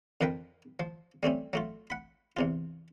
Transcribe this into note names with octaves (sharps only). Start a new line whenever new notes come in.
F2 F3 A#4 B4 G5
F3
G3 A3 C4 C#4
F#3 A3 F4
F#5 B5
E2 C3 F4